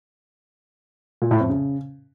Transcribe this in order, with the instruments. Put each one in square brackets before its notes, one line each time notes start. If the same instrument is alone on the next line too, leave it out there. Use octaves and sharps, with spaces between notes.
[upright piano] A#2
A2
F2
C#3